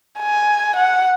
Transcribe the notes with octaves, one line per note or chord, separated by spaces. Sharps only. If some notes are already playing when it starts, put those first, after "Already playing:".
G#5
F#5